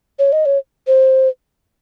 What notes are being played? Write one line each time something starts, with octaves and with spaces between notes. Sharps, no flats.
C#5
D#5
C#5
C5